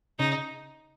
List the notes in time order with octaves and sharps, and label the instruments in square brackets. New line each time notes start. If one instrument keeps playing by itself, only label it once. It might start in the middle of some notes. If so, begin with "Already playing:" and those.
[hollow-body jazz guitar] C#3 [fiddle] D#4